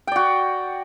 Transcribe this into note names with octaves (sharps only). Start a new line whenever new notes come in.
F#4 D5 G5